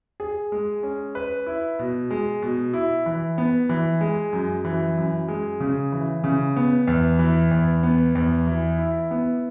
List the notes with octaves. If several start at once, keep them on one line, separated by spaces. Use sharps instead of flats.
G#4
G#3
C#4
B4
E4
B2
G#3
B2
E4
E3
B3
E3
G#3
F#2
E3
F#2
G#3
C#3
E3
C#3
B3
E2
E3
E2
B3
E2
E3
E4
B3